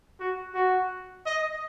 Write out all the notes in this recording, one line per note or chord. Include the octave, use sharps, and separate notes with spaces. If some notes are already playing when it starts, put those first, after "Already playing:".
F#4
F#4
D#5